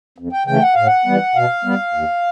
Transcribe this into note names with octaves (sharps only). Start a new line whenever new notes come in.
F2
G5
C#3 E3 A3 G5
F#5
A2 F5
F#5
E3 G3 B3
B2 F5
G3 B3
D#2